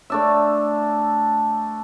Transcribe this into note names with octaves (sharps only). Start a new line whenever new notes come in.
A3 D4 E5